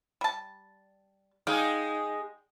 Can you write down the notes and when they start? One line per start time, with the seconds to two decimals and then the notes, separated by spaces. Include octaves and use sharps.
0.21 G3 A5
1.47 G#3 D#4 G#4 D5 F5 G5